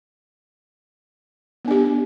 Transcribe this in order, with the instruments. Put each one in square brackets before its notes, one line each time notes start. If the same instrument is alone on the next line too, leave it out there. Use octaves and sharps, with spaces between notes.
[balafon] B3
D4
G4